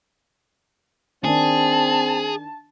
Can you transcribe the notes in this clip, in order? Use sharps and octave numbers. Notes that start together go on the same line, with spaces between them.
D#3 C4 D4 G#4 A5